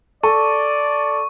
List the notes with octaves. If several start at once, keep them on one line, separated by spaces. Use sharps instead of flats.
A4 D5 C#6